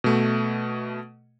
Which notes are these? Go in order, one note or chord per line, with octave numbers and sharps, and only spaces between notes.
B2 A3